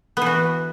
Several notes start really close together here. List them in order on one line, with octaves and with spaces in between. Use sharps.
B3 E3 F#4